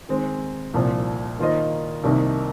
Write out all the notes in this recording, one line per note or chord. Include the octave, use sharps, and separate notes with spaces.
D#3 G#3 C4
C2 A#2 F3
D#3 A#3 F4 C5 D#5
C2 C3 D#3 A#3 D#4